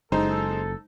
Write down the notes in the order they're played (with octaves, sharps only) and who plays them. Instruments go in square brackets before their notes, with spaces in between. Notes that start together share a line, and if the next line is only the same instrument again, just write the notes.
[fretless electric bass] F#1 [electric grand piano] G#3 C5 [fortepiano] D#4 [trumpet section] A4